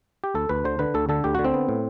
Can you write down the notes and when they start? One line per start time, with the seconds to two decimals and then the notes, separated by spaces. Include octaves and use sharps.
0.24 G4
0.34 D2 A4
0.49 D2 B4
0.64 D3 C5
0.79 D3 B4
0.94 D2 A4
1.09 D3 A4
1.24 D2 G4
1.35 D3 F#4
1.45 C4
1.54 B3
1.69 A2